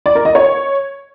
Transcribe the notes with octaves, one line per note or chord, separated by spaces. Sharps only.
D5
A#4
D#5
C#5